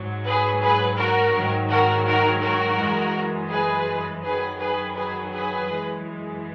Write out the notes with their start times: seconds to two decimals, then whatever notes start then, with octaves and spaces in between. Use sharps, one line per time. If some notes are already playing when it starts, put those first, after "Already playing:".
Already playing: G#2 F#3
0.26 G#4 B4
0.62 G#4 B4
0.98 F#4 A#4
1.34 G#2 D#3 F#3
1.70 F#4 A#4
2.06 F#4 A#4
2.42 F#4 A#4
2.78 F#2 E3 G#3
3.50 G#4 B4
4.22 F#2 D#3 F#3 G#4 B4
4.59 G#4 B4
4.94 G#4 B4
5.31 G#4 B4
5.67 F#2 E3 G#3